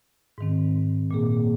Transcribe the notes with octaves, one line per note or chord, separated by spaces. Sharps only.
G#2 D#3 C4
A#2 A#3 G#4